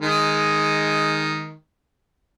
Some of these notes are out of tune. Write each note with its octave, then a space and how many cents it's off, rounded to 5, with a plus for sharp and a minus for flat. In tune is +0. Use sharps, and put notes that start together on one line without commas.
D#3 +0 G#3 +0